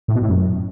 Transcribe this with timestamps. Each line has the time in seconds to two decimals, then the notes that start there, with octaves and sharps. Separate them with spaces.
0.08 A2
0.15 B2
0.22 A2
0.29 F#2